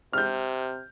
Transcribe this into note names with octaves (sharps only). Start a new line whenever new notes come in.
C3 F6 G6